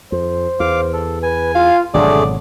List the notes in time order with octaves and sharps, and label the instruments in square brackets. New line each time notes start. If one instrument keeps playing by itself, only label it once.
[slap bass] F2 [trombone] C5
[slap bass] E2 [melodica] F5 D6
[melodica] A4
[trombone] B4 [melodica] G#5
[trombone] F4 [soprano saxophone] F5
[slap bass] G#1 B2 F#3 [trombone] D3 [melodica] A3 G#4 [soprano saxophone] D5